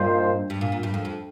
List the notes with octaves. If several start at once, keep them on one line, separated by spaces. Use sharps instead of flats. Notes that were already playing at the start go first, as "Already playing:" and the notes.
Already playing: G2 A#2 A#3 D#4 C5
G2
A#2
A#2
G2
F2
F2